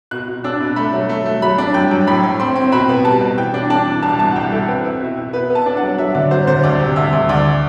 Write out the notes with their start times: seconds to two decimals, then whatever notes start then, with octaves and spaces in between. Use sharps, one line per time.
0.11 B2 F#6
0.28 B2
0.44 D4 E6
0.60 B2
0.76 A3 B5
0.93 F#3
1.09 A3
1.26 A3
1.42 F#3 B5
1.58 D4
1.74 F#2 G5
1.91 F#2
2.07 A2 B5
2.24 A2
2.40 C4 C6
2.56 C4
2.72 B2 B5
2.89 B3
3.05 G3 A5
3.21 B2
3.37 E3 G5
3.54 D4
3.70 D4 A5
3.86 E3
4.02 C2 A5
4.19 B2 A5
4.31 F#5
4.36 C2 G5
4.52 E4 A4
4.68 C4 B4
4.85 E4
5.01 B2
5.17 E4
5.33 B3 B4
5.50 B3
5.55 A5
5.66 D4
5.77 F#5
5.82 F#3
5.98 F#3 E5
6.15 D3 D5
6.31 F#3 C5
6.47 D3 C5
6.63 D2 D5
6.80 C3
6.96 D2 E5
7.13 D2
7.29 D2 D5